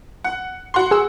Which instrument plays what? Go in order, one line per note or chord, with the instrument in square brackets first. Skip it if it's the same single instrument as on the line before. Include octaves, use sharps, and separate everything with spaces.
[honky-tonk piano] F#5
F#4 C6
[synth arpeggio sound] G#4 E6